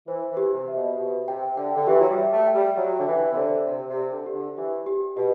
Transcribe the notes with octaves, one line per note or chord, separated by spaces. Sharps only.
E3 C5
E3
G4
C3
E5
B2
B2 G4
C3 G5
D3 G5
D3
E3 G4
F#3
G3
E5
A3
G5
G3
F#3 G4
D3
E3 E5
C3
D3 C5
C3 G4
C3
D5
D3
G4
D3
E3 G4
G4
B2 G4